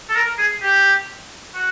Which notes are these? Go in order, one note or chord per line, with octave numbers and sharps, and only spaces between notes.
A4
A#4
G#4
G4
F#4